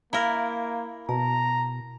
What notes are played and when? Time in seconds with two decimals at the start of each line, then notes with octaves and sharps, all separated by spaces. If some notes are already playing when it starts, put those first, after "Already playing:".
0.13 A#3 E4 A#4 E5 F5 A#5
1.09 B2 A5 A#5